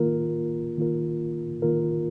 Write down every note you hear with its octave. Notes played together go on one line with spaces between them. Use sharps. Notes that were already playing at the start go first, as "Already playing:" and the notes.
Already playing: D#3 A#3 F4 A#4
D#3 A#3 F4 A#4
D#3 A#3 F4 A#4